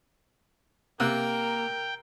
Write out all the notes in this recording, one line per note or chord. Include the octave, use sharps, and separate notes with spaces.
C3 A#3 A#4 G5 F#6